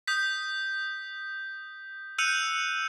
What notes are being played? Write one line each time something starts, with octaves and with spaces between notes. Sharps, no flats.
D#6 G6 B6
E6 F#6 G6 C#7 D#7 F7